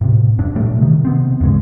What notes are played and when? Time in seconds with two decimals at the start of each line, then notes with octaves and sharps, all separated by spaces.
0.01 A2 C3
0.38 F1 F#2 D4
0.55 A#2 F#3 G3 A3
0.79 C3 D#3
1.05 C3 B3 C4
1.41 E2 G2 C#3 G#3